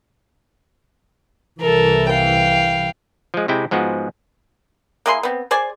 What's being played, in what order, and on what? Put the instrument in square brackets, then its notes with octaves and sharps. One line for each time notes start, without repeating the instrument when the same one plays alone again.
[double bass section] C2 E3 [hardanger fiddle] A4 A#4
[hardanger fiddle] F5 G5
[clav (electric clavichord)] F3 G#3
C3 G#3 E4 G5
G#2 F3 G#3 B3 F#4
[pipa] A#3 E4 G#4 C6
B3 C4
G#4 C5 D5 G#5